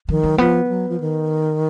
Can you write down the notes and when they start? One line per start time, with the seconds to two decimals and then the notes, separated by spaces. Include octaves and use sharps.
0.09 D#3 F3
0.23 F#3
0.38 F3 B3
0.65 F3
0.69 F#3
0.89 F3
1.00 D#3